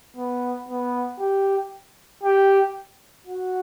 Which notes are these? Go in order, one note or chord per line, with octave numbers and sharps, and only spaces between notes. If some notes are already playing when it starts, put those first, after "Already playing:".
B3
B3
G4
G4
F#4